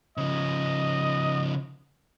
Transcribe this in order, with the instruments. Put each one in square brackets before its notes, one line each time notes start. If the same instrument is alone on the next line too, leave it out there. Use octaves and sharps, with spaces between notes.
[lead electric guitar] C#3 F3 [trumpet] D#5